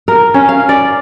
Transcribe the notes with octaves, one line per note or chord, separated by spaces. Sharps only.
A#4
C#4
F5
D5